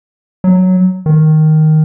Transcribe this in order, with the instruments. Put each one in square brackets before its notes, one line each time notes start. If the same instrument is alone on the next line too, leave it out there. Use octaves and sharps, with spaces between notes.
[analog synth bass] F#3
D#3